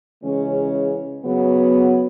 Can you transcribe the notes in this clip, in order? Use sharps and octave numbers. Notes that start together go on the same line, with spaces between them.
C#3 E3 G#3 C#4
C#3 F#3 B3